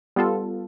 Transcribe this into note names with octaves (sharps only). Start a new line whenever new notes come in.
G3 B3 F4 A4